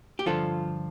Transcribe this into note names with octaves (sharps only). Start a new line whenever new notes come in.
G4
G2 D3 F3 F4 A4